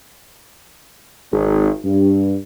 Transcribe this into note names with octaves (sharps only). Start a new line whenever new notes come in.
G#1
G2